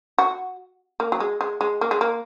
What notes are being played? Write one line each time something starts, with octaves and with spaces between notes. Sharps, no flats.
F#4
A#3
F#3
G#3
G#3
G#3
A#3
G#3
A#3